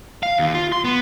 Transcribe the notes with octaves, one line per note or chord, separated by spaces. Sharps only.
F5
D#2
F4
C6
B3